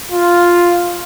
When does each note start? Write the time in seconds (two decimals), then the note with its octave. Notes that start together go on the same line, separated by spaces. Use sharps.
0.12 F4